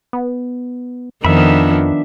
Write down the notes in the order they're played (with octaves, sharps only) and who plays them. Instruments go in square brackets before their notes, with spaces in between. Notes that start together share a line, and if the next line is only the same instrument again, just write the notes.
[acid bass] B3
[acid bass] F2 [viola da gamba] D#3 F3 B3 [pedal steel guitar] D4 E5 B5